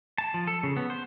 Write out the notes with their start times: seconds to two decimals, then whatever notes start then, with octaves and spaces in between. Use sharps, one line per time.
0.18 A5
0.34 F3
0.47 A4
0.63 C#3
0.77 B3
0.90 C5